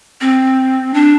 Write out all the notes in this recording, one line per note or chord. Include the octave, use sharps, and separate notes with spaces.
C4
D4